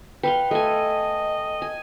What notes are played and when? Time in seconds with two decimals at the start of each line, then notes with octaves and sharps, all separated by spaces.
0.23 B4 F5 G5 C6
0.51 A3 D#5 G#5
1.62 G#5